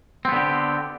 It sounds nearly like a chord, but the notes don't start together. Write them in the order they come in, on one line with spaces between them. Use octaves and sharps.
C4 B3 D3 G4